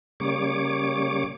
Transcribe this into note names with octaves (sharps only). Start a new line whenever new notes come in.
C#3 G3 A#3 C#5 D6